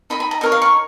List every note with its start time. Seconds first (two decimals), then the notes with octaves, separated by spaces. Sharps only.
0.10 D#4 A#4 D#5 B5
0.20 B5
0.31 A#5
0.41 D#4 A#4 C#5 D#5
0.52 F5
0.62 C#6